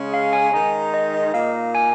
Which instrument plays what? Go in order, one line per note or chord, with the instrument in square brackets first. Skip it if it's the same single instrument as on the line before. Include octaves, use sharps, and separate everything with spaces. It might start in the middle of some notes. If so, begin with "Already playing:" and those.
Already playing: [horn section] C#3 G#3 C#4
[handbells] F5
G#5
[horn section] D#3 G#3 D#4 [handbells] A#5
[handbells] D#5
D#5
[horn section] A#2 A#3 D#4 [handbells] F5
[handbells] G#5